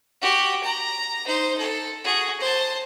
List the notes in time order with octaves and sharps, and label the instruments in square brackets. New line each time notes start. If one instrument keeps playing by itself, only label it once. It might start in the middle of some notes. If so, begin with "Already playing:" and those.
[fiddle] F#4 G4
A#5
D#4 C5
A4
F#4 G#4
C5 A5